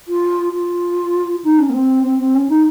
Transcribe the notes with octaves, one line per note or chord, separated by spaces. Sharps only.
F4
F4
D#4
C#4
A#3
C4
C4
C4
C#4
D#4